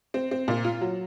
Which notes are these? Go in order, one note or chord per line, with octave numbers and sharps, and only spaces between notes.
C4
C4
A#2
F4
F#3